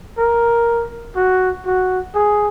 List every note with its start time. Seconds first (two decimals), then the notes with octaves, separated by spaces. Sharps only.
0.17 A#4
1.15 F#4
1.65 F#4
2.14 G#4